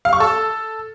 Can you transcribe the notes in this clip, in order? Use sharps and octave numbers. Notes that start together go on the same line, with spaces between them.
F5
C#6
A4